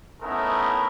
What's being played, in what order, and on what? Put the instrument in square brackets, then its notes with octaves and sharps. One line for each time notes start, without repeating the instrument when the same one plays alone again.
[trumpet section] A3 B3 C#4 D#4 E4 A#4